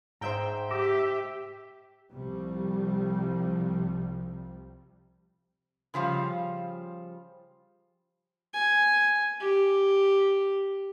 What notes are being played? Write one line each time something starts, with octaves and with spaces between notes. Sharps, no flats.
G#2 C5 E5 G5 A#5 G6
G4 E5 D6 E6 A#6
C2 C3 F3 G3
C#3 F3 G3 F5
G#5
G4